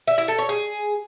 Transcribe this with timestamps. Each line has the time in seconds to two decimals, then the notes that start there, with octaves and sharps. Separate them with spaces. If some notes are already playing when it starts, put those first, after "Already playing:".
0.07 E5
0.18 E4
0.28 A4
0.39 C#5
0.49 G#4